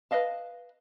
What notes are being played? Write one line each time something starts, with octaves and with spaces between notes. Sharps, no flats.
B4 C5 D#5 F5 A5